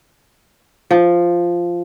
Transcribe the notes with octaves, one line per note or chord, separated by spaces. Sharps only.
F3